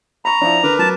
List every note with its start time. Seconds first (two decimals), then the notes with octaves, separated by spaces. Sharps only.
0.25 A#5 B5 C#6
0.41 F3 D4 E4
0.63 D3 A#4 B4 D6
0.79 F#3 A5